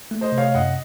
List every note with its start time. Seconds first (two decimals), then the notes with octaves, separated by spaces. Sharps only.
0.11 A3
0.21 C5 D#5
0.32 C3
0.38 C#5 F5
0.54 F#2 D#5 F#5